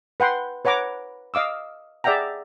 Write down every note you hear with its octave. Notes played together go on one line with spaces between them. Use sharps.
B4 F#5 G5 C6
B4 C#5 F#5 A#5 D6
D#5 F5 D6 E6
G#4 D5 E5 F#5 G5 A#5